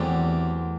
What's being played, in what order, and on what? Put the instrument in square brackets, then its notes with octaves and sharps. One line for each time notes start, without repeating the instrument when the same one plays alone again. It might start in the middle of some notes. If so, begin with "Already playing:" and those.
Already playing: [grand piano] E2 [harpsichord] A2 F#3 C4 G4